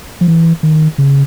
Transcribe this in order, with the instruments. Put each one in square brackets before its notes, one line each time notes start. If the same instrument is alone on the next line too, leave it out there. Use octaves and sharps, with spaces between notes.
[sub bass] F3
E3
D#3
C#3